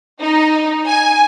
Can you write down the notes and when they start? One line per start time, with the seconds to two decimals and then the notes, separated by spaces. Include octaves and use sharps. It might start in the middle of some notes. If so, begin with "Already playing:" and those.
0.22 D#4
0.88 G#5